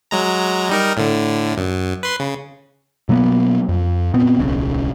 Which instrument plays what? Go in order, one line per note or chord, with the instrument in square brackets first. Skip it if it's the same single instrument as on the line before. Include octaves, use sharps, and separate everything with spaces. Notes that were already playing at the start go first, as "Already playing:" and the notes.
[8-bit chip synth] F#3 G#3 A#5
G3 D#4 A#4
A2 D3
F#2
B4 C6
C#3
[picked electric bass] B2 F#3 A#3 B3
F2
A#2 B3 C4
D1 B1 C#3